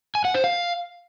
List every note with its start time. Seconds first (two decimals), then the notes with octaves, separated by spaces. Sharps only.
0.15 G#5
0.25 F#5
0.34 C5
0.44 F5